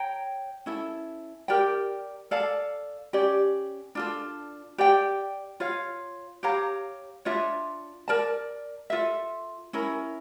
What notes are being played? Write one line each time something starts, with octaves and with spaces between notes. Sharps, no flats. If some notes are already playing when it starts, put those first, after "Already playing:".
Already playing: C#5 G5 A#5
C#4 E4 A4
G4 A#4 D5 G5
A4 D5 F5 A5
C#4 G4 D5
D4 F4 A4
G4 D5 G5
F4 C#5 F5
G4 C#5 F5 A#5
D4 F4 C#5 E5
A#4 D5 A5
F4 A4 E5
C#4 E4 A#4